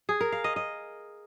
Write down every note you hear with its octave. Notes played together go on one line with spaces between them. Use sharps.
G#4
A#4
F5
D#5
D#5